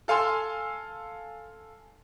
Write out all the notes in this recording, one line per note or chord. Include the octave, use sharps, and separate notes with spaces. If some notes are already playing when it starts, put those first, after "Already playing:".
A4 F5 G#5 C6 E6